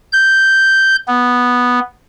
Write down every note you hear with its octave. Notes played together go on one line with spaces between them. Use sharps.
G6
B3